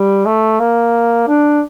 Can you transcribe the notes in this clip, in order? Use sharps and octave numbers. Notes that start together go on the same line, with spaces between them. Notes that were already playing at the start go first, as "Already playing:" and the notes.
Already playing: G3
A3
A#3
D4